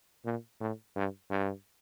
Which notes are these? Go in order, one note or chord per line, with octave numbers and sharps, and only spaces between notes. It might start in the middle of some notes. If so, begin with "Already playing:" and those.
A#2
A2
G2
G2